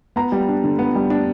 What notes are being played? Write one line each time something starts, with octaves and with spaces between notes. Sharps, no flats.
B3 A#5
G3
D4
D3
B3
G3
D4